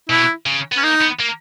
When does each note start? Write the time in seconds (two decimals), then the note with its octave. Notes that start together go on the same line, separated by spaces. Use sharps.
0.09 B2 E4
0.46 C#3
0.72 B3
0.77 C#4
0.83 A#3 D#4
1.02 B3
1.20 A#3